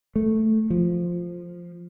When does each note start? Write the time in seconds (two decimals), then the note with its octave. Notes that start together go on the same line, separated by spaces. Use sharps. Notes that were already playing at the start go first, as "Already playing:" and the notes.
0.16 A3
0.70 F3